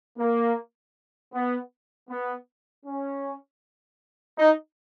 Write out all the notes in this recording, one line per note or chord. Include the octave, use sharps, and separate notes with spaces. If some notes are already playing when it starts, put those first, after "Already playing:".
A#3
B3
B3
C#4
D#4